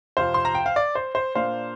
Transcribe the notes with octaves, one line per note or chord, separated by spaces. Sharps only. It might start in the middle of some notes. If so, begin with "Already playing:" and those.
F2 C3 F3 C5 F5
C6
A#5
G5
F5
D5
C5
C5
A#2 A#3 D4 C5 F5